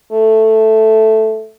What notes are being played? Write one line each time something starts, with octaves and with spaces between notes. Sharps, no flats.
A3